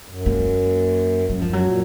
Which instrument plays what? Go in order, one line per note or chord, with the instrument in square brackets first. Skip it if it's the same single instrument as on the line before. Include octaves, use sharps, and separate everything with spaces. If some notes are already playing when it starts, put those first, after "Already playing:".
[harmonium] F#2
[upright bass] A#3
[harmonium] F#2 [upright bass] F#3
[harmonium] F#2 [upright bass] F3
[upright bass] F#3
[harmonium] A#2